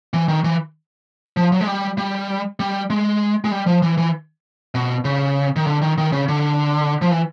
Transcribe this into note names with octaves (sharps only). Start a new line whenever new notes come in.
E3
D#3
E3
F3
F#3
G#3
G3
G3
G3
G#3
G#3
G3
F3
E3
E3
B2
C#3
D#3
D3
D#3
D#3
C#3
D3
F3
E3